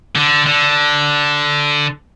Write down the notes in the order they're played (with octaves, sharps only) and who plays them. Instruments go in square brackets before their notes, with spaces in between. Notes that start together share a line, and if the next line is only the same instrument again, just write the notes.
[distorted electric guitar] D3
D3